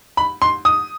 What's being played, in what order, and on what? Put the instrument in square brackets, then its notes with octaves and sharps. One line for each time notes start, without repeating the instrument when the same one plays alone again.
[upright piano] B5
C6
D#6